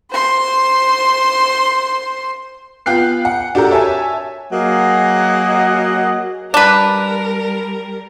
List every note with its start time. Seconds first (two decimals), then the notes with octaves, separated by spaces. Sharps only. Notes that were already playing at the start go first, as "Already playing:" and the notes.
0.11 C5 C6
2.86 B3 F4 F5 G5 F#6 C7
3.25 F#5
3.55 D4 F#4 G4 A4 A#4
3.71 C#5 E5 G#5 A5
4.52 F#3 A#3 G#4 D#5 F#5
6.54 G3 D4 A#4 B4